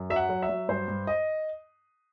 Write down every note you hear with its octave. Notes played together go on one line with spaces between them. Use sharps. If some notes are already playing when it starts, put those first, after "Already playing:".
Already playing: F#2
F#3 E5
F#5
F#3
E5
F#3
G2 C5
G2
D#5